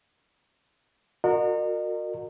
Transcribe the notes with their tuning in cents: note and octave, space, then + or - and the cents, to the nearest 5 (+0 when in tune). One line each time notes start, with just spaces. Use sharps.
F#4 -30 A#4 -25 D#5 -40